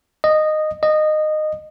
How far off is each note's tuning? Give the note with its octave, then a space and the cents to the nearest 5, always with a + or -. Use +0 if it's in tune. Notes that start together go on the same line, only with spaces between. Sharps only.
D#5 -10
D#5 -15